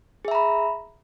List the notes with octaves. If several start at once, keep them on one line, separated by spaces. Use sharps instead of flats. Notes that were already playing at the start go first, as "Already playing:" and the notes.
G#4 E5 A#5 B5